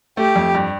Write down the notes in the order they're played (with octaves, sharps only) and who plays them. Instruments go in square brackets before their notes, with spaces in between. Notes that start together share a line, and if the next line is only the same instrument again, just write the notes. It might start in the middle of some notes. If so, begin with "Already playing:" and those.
[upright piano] A3 [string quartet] G4
[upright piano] F2
G2